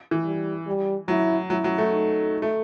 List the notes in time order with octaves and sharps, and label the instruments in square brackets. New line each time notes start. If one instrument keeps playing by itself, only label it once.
[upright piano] E3
[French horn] G3
G3
[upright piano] F#3 [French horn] E4
[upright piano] F#3 [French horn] E4
[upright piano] F#3
A3
[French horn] D#4
[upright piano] A3